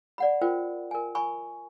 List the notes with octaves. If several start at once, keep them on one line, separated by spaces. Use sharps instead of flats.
D5 F#5 B5
F4 A#4 C5 G5
A#4 G#5
G#5 B5 C#6